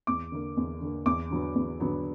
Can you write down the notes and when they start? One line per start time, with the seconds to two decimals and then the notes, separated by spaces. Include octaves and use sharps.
0.07 E2 D6
0.32 D3 A#3
0.57 E2
0.81 D3 A#3
1.06 E2 D6
1.31 D3 F#3 B3
1.55 E2
1.80 D3 F#3 B3